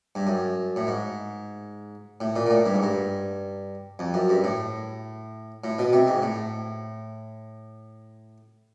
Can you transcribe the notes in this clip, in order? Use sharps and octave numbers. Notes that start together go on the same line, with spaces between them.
G2
F#2
A2
G#2
A2
A#2
A#2
A2
G2
G#2
G2
F2
F#2
G2
A2
A2
B2
C3
G#2
A2